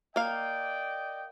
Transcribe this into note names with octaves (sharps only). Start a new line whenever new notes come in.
A#3 D5 D#5 F5 G5